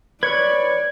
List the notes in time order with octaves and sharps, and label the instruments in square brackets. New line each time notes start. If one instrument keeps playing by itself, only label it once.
[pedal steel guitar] B4 C#5 F#6 [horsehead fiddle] D5 [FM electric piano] G#6